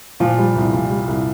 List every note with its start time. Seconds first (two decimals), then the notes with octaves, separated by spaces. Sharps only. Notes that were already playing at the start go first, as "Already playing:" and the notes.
0.20 A#2 F3
0.38 G3
0.56 C2
0.73 A#2
0.91 G3
1.08 C2